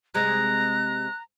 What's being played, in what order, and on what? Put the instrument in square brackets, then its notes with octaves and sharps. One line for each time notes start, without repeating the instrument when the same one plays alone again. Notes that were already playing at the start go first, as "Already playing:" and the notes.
[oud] C3 G#3 [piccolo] A#5 [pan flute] F#6